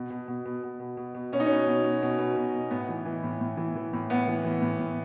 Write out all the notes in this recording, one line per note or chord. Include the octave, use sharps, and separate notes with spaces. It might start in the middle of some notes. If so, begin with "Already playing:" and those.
Already playing: B2
B2
B2
B2
B2
B2
B2
B2
B2 C#4
D#4
B2 C#4
B2
B2
B2
B2
B2
B2
A2 B3
E3
E3
A2
A2
E3
E3
A2
A2 B3
E3
E3
A2
A2